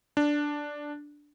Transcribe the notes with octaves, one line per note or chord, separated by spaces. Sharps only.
D4